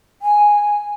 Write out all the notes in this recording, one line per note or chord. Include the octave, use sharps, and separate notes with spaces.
G#5